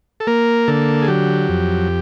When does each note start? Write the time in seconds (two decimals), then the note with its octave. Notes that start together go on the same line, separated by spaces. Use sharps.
0.20 A4
0.27 A#3 A#4
0.68 D3 A4
1.02 G#4
1.08 F#3 G4
1.48 F2